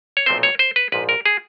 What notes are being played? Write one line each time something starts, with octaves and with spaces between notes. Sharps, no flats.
C#5
B1 A#2 F3 A3 C4 C5
C#5
C5
B4
A#1 G#2 F3 B4
A#4
G#4